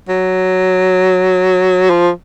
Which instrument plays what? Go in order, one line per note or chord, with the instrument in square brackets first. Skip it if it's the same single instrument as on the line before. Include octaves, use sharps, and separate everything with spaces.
[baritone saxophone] F#3
F3